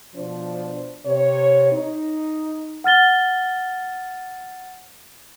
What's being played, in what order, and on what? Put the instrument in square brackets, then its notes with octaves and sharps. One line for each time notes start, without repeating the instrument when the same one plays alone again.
[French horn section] B2 F3 D4 C5
C3 C#5
D#4
[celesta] F#5 F6 A6 G7